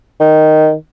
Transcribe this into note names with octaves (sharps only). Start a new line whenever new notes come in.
D#3